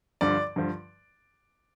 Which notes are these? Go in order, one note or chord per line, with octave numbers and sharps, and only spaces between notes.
G2 D3 F3 D5
G2 D3 F3